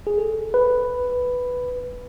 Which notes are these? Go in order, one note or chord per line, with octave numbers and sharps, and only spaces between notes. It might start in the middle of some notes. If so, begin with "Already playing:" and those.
G#4
A4
B4